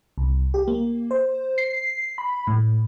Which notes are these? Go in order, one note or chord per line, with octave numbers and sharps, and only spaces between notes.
C2
G4
A#3
C5
C7
B5
A2